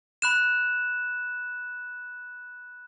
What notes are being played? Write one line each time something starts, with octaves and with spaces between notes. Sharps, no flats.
B5 F#6 E7